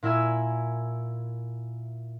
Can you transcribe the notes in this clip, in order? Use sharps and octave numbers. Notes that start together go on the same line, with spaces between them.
A#2 E4 A#4 E5 G#5 E6